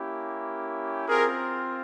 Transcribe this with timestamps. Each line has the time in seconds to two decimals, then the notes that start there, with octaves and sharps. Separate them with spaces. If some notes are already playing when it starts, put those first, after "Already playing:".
Already playing: A#3 C#4 E4 G4
1.07 C4 F4 G#4 A#4